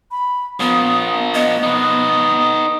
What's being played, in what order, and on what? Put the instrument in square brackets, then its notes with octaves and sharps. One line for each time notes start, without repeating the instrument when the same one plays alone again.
[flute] B5
[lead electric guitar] F3 A#3 [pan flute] B3 [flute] D#6
[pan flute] B3 [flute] D#5
[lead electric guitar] D#4 B4 [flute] D#6